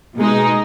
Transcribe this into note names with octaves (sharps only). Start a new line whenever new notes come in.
B2 G#3 D#4